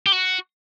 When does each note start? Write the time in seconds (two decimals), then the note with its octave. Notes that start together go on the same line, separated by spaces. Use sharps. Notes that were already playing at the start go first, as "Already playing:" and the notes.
0.06 G4
0.12 F#4